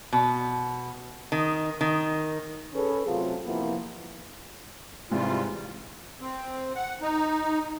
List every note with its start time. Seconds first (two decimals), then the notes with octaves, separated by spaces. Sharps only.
0.13 B2
1.32 D#3
1.81 D#3
2.74 C#4 G#4 A4 B4
3.07 C3 F#3 A3 C4 F4
3.45 C3 E3 F3 A#3 B3
5.11 G#2 C3 E3 G3 C4 F4
6.21 C4
6.76 F#5
7.02 D#4